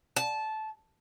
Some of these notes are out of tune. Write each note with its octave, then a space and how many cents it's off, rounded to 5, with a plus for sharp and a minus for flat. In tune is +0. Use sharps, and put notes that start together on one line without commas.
A5 -15